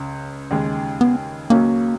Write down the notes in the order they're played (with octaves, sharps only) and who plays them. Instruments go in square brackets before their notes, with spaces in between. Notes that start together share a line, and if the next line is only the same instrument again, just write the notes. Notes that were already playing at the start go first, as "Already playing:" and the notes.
Already playing: [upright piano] C#2 C#3
D#2 C#3 G#3
[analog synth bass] B3
[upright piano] C#2 C#3 F#3 C#4 [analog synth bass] A#3